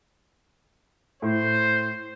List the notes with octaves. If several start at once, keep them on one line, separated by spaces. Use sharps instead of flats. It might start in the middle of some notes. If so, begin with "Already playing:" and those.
A2 C5